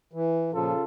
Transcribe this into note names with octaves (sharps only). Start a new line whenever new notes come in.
E3
A#2 C#3 F3 F4 A4